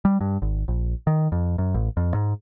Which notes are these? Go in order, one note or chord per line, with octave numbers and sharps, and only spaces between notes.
G3
G2
G#1
A#1
D#3
F2
F#2
A1
F2
G#2